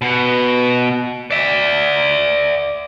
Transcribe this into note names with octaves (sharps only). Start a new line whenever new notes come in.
B2
D5 E5